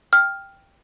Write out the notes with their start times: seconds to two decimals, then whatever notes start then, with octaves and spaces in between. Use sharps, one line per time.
0.13 G5 F6